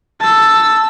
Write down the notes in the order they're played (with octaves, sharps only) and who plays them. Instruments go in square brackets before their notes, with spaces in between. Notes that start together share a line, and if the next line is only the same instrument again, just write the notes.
[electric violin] A5 E6